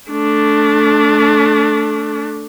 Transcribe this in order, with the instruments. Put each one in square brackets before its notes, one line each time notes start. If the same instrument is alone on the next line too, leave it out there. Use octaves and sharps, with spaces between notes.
[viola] A3 D4